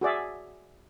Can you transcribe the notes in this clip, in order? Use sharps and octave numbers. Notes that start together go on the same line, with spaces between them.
F#4 G#4 D5 E5